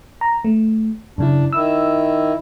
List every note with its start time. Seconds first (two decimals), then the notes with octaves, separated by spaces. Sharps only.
0.21 A#5
0.45 A3
1.18 F#2 C#3 D4 E4
1.53 D#3 E4 E6